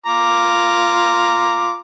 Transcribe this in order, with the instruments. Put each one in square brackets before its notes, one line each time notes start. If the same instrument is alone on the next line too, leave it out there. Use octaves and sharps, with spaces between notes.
[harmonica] F4 A#5 D6